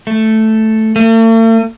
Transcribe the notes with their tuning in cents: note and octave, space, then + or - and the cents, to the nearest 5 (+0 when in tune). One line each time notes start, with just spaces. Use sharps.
A3 +0
A3 +45